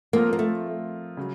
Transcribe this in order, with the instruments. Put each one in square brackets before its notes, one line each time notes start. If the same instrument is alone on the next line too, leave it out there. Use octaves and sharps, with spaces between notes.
[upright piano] F3 C4 F4 A#4 [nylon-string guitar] A#3
[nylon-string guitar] A#3
A3
[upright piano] C#3 F#3